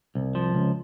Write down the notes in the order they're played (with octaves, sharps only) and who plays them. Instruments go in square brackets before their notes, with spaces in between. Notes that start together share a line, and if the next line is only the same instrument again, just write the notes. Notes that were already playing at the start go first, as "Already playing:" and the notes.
[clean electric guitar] C2
F3
C#2